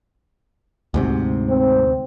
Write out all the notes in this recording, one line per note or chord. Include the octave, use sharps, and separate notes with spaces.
D2 G#2 C3
C4